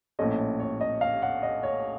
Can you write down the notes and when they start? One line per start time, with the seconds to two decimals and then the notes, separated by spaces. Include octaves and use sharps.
0.19 A#1 A2 A3 C#4 D#5
0.60 C#5
0.81 D#5
1.01 F5
1.22 F#5
1.43 D#5
1.63 C#5